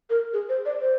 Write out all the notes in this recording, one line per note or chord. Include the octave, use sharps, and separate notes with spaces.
A#4
G#4
C5
D5
C5